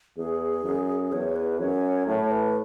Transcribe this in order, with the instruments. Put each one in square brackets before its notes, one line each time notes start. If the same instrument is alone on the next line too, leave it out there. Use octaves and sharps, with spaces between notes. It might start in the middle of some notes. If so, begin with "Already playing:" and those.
[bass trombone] E2 [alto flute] G#4
[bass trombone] F#2
[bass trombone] E2 [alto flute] C#5
[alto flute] B4
[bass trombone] F#2 [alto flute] C#5
[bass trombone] A2 [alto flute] C#5
[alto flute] B4